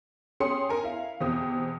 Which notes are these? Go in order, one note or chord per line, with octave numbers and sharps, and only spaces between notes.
C#4 G4 G#4 C6 C#7
A#4 G#5
E4 F5
E2 B2 C4 G4 D#6